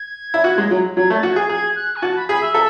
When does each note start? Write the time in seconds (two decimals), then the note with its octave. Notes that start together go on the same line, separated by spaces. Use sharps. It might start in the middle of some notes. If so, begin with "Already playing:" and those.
Already playing: G#6
0.34 E4
0.44 F#4
0.58 G#3
0.71 F#3
0.96 F#3 G#6
1.10 A3
1.15 A6
1.23 F#4
1.32 G#4 G#6
1.49 G#4 G#6
1.76 F#6
1.96 G#5
2.02 F#4 A5
2.16 B5
2.28 G#4 B5
2.41 E5
2.54 A4